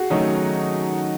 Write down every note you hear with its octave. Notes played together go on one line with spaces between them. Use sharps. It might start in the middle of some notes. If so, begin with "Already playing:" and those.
Already playing: F#4 G#4
D#3 F#3 A3 C#4 D#4